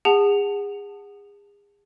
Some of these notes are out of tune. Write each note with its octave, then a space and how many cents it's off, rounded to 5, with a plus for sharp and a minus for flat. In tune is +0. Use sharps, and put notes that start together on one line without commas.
G#4 -35 F#5 +0 A5 +0